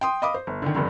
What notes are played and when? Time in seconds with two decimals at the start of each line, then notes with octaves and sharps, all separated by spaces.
0.01 G5 C6 D#6
0.22 D#5 F5 B5 D6 D#6
0.34 C5
0.47 G1
0.62 D3 D#3
0.75 F1 G2 D3